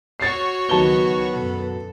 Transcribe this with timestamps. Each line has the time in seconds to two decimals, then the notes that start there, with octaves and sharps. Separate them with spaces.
0.20 F#4 C#5 C#6 A6 C7
0.69 C#2 D#3 F#3 B3 A5 G7
1.34 F#2 B2 A4